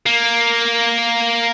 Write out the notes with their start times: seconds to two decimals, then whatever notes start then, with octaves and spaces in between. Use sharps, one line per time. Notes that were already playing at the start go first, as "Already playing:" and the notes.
0.06 A#3